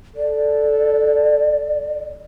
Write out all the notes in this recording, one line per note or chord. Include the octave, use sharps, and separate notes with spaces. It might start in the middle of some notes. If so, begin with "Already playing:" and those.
A4 D5